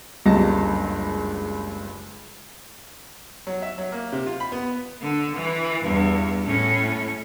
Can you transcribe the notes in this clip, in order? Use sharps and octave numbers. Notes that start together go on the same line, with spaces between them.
F#1 C#2 G2 D3 A5 A#6
F#3
E5
F#3
A#3
C3
F4
B5
B3
D3
E3
E2 G2
A2 C#4